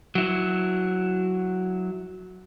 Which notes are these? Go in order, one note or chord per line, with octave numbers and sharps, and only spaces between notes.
F#3 E4